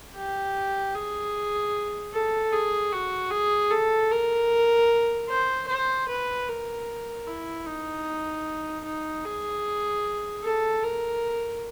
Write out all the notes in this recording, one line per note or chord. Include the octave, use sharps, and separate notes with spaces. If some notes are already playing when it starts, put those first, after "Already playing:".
G4
G#4
A4
G#4
F#4
G#4
A4
A#4
C5
C5
B4
A#4
E4
D#4
D#4
G#4
A4
A#4